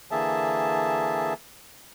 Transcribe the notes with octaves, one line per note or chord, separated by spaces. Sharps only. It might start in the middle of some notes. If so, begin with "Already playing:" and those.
D3 E3 A#3 G#4 E5 A5